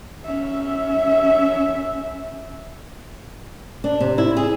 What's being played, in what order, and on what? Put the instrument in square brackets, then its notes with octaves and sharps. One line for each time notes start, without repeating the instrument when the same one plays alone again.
[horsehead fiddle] C#4 E5
[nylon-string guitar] D4
C3
E4
G#4